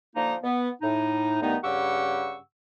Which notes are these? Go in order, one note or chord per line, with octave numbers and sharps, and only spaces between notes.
D3 F3 A#3 D#4
B3
A2 D#4
G2 D#3 A3 B3 D#4
G2 C#3 G4 F#5 C#6 E6